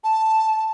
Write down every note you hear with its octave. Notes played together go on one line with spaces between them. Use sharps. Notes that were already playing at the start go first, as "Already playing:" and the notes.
A5